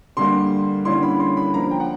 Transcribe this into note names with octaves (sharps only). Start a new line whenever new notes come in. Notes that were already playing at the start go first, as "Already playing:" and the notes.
D3 G3 A#3 C6
D3 G3 A#3 C#4 E4 C6
B5
C6
B5
F3 A#3 D4 A#5
G5
F#5